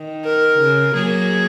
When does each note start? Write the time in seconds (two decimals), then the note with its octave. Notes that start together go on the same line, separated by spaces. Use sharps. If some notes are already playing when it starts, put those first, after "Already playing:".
Already playing: D#3
0.24 A#4
0.59 C#3
0.95 F#3 A#3 G#4